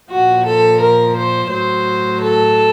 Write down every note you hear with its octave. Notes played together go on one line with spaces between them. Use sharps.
A#2 F3 F#4
A4
A#4
C5
A2 F#3 C5
A4